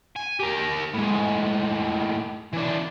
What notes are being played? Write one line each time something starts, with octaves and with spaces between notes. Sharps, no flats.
G#5
G4 A#4
A2 G#3
E3 D4